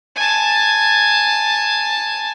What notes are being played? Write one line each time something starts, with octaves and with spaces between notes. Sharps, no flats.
G#5 A5